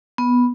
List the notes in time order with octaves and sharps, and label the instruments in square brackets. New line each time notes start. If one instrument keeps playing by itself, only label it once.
[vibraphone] B3